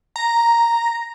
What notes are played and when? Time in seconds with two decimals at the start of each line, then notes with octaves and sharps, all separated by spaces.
0.16 A#5